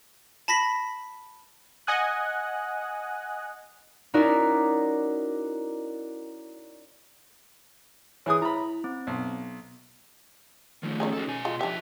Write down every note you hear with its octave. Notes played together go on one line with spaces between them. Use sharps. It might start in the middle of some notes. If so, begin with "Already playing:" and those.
A5 B5 A#6 B6 F#7
D#5 F#5 G#5 D#6 F#6
C#4 D#4 E4 F#4 A#4 D5
E3 G#4 C#5 D#6
E4 A#5 B5
C4
B1
D#3 F3 A3
C#4 D#4 G#4
F#4 A4
B2 G#5
G#3 F4
F3 D4 G4 E5